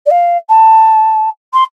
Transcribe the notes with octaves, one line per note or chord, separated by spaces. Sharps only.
D5
F5
A5
C6